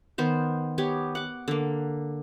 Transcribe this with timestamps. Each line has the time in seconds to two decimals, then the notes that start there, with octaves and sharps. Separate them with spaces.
0.18 D#3 B3 C5
0.78 B3 G4 C#5
1.15 F#5 D6
1.48 D3 A#3